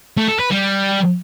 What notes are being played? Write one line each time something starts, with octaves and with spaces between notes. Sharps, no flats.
A3
A4
B4
G3